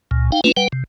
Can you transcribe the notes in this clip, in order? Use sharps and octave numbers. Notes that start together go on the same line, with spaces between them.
C#2 A#2
D#4 F5 G5
A3 A#3 C#4 D4 F4 B4
G3 B4 F#5 G5
C3